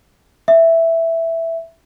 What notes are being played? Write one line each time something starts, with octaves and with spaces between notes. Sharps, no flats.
E5